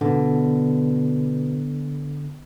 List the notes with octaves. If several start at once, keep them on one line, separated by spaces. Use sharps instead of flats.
B2 D3